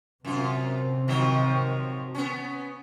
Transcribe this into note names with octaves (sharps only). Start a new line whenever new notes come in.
F#2 C3 C4 F4
D#3 F3 F#3
B3 C#4